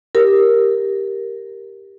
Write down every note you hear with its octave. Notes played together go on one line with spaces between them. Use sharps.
G4 A#4